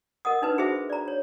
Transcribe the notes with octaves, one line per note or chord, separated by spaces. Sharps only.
A#4 D#5 F#5 D#6
D4 D#4 B4
F#4 G#4 C5 E5
D5 A#5
C#5